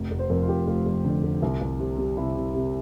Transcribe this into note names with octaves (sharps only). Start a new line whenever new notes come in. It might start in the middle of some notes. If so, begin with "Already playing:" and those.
Already playing: F1
F1
C5
F2 A#4
F4
F1 G4
F1 F4
F2
D3
F1
C2
C2
C3
G3
C3 E4
C3
C3